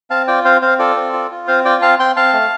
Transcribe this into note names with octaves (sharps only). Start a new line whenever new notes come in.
C4 F5 A5
F4 D5 G5
C4 C5 F5
C4 C5 F5
F4 A4 D5
C4
F4
F4
C4 C5 F5
F4 D5 G5
C4 F5 A5
C4 G5 C6
C4 F5 A5
A3